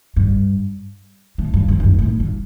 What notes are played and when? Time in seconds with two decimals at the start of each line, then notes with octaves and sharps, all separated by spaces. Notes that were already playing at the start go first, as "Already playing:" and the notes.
0.16 G2
1.38 A2
1.54 G2
1.68 F#2
1.80 F#2
1.84 G2
1.99 A2
2.20 G2